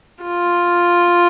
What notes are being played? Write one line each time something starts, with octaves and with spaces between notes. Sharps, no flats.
F4